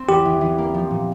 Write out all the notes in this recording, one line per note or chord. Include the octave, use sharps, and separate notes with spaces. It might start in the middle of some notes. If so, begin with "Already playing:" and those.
Already playing: C4
E2 G4
E3
E3
A#3
F3
A#2